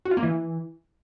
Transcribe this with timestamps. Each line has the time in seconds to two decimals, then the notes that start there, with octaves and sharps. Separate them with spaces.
0.05 F#4
0.11 F4
0.17 A#3
0.23 E3